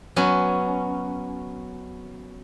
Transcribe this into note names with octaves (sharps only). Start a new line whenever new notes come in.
F#3 B3 C#4 F#4